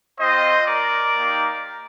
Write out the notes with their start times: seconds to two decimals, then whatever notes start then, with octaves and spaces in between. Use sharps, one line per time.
0.19 C4 F4 C5 D#5
0.66 A#4 D5
1.15 A#3 D#4 G4